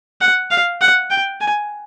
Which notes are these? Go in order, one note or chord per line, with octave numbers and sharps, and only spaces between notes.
F#5
F5
F#5
G5
G#5